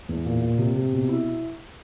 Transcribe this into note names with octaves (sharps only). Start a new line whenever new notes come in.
E2
A#2
A#2
C3
C3
B2
E4